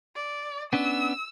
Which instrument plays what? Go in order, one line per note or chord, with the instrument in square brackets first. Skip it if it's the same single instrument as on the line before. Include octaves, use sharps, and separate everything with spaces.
[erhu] D5
[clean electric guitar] B3 C#4 D4 [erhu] E6